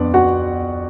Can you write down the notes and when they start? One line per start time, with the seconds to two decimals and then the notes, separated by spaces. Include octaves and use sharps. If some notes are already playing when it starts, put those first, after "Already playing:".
Already playing: F2 B3 D4 D5
0.14 F#4 F#5